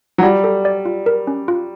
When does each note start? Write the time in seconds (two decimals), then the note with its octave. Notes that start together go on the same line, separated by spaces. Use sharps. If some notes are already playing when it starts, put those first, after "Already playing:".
0.18 F#3
0.23 G3 F4
0.44 A4
0.65 D5
0.85 F4
1.06 A#4
1.27 C#4
1.48 F4